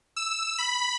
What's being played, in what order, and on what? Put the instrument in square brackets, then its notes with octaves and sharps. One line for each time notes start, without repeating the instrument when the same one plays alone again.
[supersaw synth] E6
B5